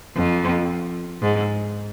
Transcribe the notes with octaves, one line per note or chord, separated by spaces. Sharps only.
F2
G#2